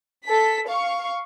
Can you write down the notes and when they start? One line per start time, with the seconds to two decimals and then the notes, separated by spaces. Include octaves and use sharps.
0.25 A4 B6
0.67 F5 C#6